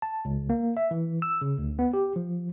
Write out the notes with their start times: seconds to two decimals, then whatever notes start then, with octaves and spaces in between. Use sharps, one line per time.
0.02 A5
0.25 C#2
0.50 A#3
0.77 E5
0.91 E3
1.22 E6
1.41 C#3
1.58 D2
1.79 B3
1.93 G4
2.16 F3